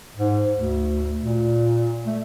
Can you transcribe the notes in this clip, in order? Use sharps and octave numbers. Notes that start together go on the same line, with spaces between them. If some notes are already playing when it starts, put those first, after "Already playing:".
G#2
D2
A#2
A3